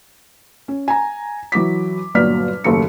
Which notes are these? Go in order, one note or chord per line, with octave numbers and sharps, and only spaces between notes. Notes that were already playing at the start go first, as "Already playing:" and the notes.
C#4
G#5 A#5
E3 F#3 D6 B6
G1 A#2 F#3 D5 F6 B6
F#1 D#2 A3 C#7